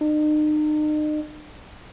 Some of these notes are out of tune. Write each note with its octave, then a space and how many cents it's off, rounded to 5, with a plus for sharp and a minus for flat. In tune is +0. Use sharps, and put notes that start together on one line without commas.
D#4 -40